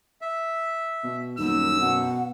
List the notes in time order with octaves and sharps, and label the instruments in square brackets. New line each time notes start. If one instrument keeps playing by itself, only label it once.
[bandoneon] E5
[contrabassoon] B2
[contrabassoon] D#1 [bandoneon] F#2 [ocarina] D#4 [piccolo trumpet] E6
[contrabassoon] B2 [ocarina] F#5